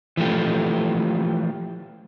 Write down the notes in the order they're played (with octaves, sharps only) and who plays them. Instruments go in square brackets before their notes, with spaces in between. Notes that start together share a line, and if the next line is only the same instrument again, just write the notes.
[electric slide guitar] E3 F3 A3 G4